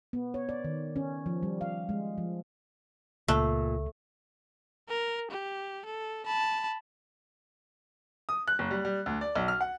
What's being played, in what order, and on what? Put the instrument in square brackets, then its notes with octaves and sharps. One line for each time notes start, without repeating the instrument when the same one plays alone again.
[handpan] B3
C#5
D5
D#3
C#4
F3
G3
F5
G#3
F3
[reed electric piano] C#2 [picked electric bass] A#2 [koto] A3
[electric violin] A#4
G4
A4
A5 B5
[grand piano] D#6
F#6
F#1
G3
G3
D2
D5
B1
F6
F#5